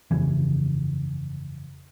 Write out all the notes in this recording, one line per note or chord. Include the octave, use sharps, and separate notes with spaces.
G1 F2 C#3 E3